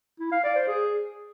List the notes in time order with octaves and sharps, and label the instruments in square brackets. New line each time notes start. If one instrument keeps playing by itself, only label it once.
[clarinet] E4
F5
D5
C5
G#4